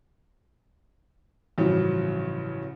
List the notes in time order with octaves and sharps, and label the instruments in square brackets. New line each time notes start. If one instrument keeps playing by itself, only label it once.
[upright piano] A1 G2 C#3 F3 F#3